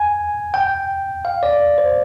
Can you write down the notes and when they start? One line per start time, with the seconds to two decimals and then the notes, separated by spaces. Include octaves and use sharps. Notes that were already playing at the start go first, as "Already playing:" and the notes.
Already playing: G#5
0.54 G5
1.25 F5
1.43 D5
1.78 C5